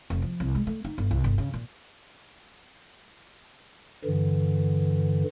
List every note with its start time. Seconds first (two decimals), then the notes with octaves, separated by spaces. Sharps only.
0.10 F1
0.22 F3
0.40 C2
0.55 G#3
0.67 A3
0.85 D#4
0.98 G1
1.11 C2
1.24 G1
1.38 C#3
1.54 A#2
4.05 G2 D3 E3